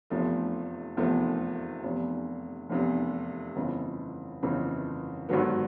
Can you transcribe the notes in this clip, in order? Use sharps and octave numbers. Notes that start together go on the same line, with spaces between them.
F1 E2 C3 F3 A3
F1 E2 C3 F3 A3
F1 E2 C3
F1 E2 C3
G1 F2 C#3 E3
G1 F2 C#3 E3
G#1 G2 D3 F#3 B3